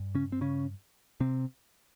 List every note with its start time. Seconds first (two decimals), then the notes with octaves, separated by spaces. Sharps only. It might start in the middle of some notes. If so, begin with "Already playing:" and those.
Already playing: G2
0.15 C#3 C#4
0.32 C4
0.41 C#3 C#4
1.20 C3 C4